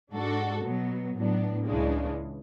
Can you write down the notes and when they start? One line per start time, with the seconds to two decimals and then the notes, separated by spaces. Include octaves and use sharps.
0.13 G#2 G#3 D4 F#4 A4
0.64 B2 F#3 B3
1.16 A2 F#3 B3 D4
1.66 C#2 C#3 E3 G#3 D4